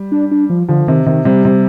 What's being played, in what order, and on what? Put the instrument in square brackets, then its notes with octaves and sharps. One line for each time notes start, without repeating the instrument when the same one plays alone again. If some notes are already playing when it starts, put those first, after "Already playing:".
Already playing: [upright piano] G3
[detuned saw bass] D4
D4
F3
[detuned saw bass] D3 [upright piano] F3
[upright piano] C3 [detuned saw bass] D#3
[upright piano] C3 [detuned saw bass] D#3
[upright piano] C3 [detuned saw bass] G3
[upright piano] C3